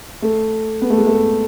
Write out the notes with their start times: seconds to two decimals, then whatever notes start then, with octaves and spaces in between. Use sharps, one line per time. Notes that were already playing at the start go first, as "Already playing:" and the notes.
0.22 A3
0.82 B3
0.90 A3
0.98 G#3
1.07 A3